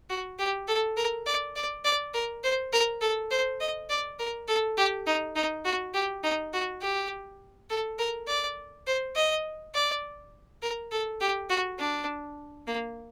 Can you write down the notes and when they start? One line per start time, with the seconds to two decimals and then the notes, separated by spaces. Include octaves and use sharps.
0.10 F#4
0.39 G4
0.68 A4
0.97 A#4
1.26 D5
1.56 D5
1.85 D5
2.14 A#4
2.44 C5
2.73 A#4
3.02 A4
3.31 C5
3.60 D#5
3.90 D5
4.19 A#4
4.48 A4
4.77 G4
5.07 D#4
5.36 D#4
5.65 F#4
5.94 G4
6.24 D#4
6.53 F#4
6.82 G4
7.69 A4
7.99 A#4
8.28 D5
8.87 C5
9.16 D#5
9.74 D5
10.62 A#4
10.91 A4
11.21 G4
11.49 F#4
11.79 D4
12.67 A#3